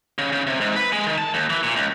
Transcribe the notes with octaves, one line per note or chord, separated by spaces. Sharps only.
C#3
C#3
C3
G#2
B4
G#3
D#3
A5
D#2
E3
A#2
C#2